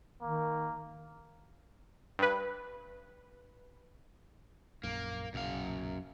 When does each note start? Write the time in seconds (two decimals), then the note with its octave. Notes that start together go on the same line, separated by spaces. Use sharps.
0.22 D#3 A#3
2.19 G2 B4
4.83 A#1 F#2 A#3
5.34 B1 F#2 A#2 C#3 F5